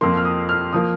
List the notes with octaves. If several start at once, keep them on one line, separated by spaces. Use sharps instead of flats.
F2 F3 A#3 C6
F6
D#6
F6
F3 A#3 D#6